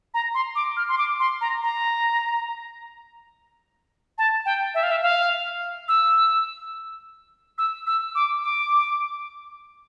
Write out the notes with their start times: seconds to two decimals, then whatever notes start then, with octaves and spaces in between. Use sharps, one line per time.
0.14 A#5
0.34 C6
0.56 D6
0.77 F6
0.89 C6
0.98 D6
1.20 C6
1.41 A#5
1.63 A#5
4.18 A5
4.46 G5
4.75 E5
4.83 F5
4.91 E5
5.02 F5
5.88 E6
7.58 E6
7.87 E6
8.15 D6
8.43 D6